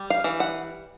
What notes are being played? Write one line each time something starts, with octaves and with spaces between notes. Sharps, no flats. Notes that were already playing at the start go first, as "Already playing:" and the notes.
Already playing: G3
F5
E3
F#5